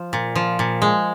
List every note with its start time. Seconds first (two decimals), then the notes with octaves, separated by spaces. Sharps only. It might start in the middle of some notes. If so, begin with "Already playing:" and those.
Already playing: F3
0.13 A#2
0.35 F3
0.59 A#2
0.82 G#3